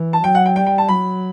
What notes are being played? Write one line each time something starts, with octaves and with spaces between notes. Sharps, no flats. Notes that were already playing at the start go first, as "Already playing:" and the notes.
Already playing: E3
A5
F#3 G5
F#5
G5
G3 G5
G5
A5
F#3 B5